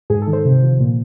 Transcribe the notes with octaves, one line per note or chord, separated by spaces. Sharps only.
G#2 G#4
A4
D#3
C5
C3
F3
A#2